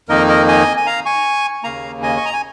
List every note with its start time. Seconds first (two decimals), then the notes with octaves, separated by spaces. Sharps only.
0.09 F2 D#3 A#3 D#4 A#4 D#5
0.28 A#4 D#5
0.48 D#5 G#5
0.77 G#5
0.86 F5 A#5
1.05 G#5 C#6
1.64 D#2 C#3 A#3 F5 A#5
2.02 D#5 G#5
2.17 C#6
2.25 A#5
2.33 G#5